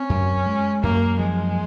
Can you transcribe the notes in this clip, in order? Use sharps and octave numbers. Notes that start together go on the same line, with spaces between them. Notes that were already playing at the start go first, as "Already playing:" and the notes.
Already playing: C4 C#4
F#2
G#3
F#2 A#3
F3 G#3